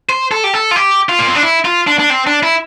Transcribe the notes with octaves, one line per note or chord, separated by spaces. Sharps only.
C5
A4
G4
A4
F4
G4
F4
A#3
C4
D4
E4
F4
D4
D4
C4
D4
E4